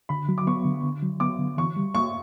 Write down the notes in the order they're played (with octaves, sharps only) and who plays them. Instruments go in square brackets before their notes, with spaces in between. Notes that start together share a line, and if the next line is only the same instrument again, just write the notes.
[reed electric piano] D3 [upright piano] B5
[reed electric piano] F#3
[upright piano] D6
[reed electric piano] B3 [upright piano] C#6
[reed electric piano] D3
D3
F#3
[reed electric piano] B3 [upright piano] D6
[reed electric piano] D3
[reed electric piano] E3 [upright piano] C#6
[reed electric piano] G3
[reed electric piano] A#3 [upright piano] C#6